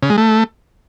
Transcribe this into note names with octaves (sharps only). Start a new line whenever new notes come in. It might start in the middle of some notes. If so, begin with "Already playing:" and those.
C#3
G#3
A3